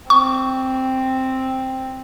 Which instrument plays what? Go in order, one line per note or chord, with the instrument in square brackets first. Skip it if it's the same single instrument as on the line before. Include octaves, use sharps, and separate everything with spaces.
[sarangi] C4 [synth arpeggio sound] C#6